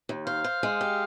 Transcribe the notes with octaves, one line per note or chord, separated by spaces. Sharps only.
D#2
C5 F5
C5
G#3
G4